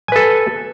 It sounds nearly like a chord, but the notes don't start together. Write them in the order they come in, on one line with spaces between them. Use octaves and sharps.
G#5 B4 A4